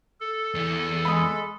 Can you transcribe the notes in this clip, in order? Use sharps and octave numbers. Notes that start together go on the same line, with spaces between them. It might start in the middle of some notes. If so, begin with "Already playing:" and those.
A4
E2 E3
G#3 B5 D#6